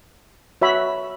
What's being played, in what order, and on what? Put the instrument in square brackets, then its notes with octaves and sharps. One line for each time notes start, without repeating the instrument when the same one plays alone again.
[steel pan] F#4 C#5 E5 B5